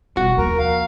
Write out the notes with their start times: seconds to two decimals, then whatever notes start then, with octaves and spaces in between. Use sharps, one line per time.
0.17 E1 G3 F#4
0.38 D#2 F3 A#4
0.59 F5